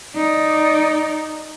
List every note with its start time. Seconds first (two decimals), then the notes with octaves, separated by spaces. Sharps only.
0.16 D#4 D5